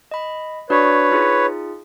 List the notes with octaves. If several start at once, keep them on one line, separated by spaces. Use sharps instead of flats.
D#5 B5
D4 F#4 B4 C#5 D5
D#4 F4 G#4